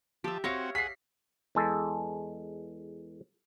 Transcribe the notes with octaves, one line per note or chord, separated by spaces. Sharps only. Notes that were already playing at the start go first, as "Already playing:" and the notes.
F3 G4 E5 A5
C4 F#4 C#5 E5 F5 A#6 C#7
G#4 F#5 B6 C7
E2 G#3 A4